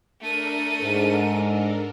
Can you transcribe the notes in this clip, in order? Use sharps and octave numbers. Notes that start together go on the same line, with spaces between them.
A3 D4 A4 A#4 D#7
G#2